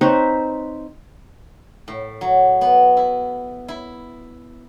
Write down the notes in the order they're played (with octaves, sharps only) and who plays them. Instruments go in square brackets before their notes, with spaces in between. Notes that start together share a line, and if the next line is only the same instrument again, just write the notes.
[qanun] C4 D#4 B4 C#5
[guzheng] A2
F#3
B3
E4
E4